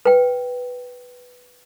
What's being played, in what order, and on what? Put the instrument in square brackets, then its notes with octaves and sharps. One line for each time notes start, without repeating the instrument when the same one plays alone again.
[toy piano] B4 G5